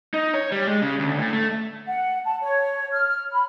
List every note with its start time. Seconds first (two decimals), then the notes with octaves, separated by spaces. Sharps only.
0.14 D#4
0.34 C#5
0.52 G3
0.67 G#3
0.82 C#3
0.99 D2
1.19 A2
1.33 A3
1.86 F#5
2.24 A5
2.41 C#5
2.92 F6
3.32 B5